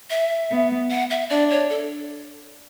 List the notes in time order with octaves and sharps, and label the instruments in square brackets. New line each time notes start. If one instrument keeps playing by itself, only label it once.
[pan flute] E5
[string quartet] B3
[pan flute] F#5
E5
[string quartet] D4 [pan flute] D5
[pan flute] C#5
A4